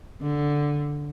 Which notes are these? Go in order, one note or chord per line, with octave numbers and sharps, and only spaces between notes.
D3